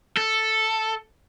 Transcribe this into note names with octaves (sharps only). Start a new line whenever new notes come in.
A4